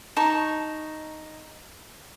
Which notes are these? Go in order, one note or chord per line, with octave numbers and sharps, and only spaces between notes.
D#4 A5 C#6